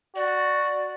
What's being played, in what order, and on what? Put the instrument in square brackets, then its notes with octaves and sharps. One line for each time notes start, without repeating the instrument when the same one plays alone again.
[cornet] F#4 [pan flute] D5